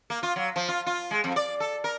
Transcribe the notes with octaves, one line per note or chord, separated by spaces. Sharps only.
A#3
F4
F#3
F3
F4
F4
G#3
F2
D5
A4
A#4